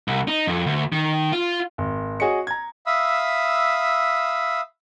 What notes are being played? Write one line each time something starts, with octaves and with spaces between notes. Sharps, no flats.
C2
D#4
F2
D2
D#3
F4
G#1
F#4 G#4 C#5 D#5 C#7
A#5 G#6
E5 F5 B5 D#6 E6